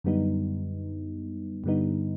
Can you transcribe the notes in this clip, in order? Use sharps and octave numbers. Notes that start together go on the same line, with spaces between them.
F#2 D3 G3 B3 D#4
G2 D3 G3 B3 D#4